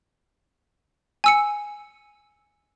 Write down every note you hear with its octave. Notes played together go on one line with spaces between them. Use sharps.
G#5 E6 C#7